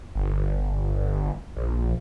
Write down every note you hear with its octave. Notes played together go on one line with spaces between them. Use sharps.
G1
A#1